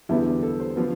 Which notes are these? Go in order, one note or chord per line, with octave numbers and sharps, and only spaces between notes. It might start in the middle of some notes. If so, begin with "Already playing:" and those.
E2 D3 G3 B3 E4
G4
A4
C5
D3 F3 B3